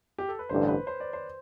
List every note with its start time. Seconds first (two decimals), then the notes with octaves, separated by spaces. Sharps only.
0.18 G4
0.28 A4
0.39 B4
0.49 A1 G2 D3 C5
0.68 B4
0.87 C5
1.00 D5
1.13 C5